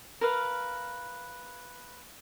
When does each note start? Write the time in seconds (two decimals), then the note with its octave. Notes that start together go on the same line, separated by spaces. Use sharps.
0.21 A#4 B4 F5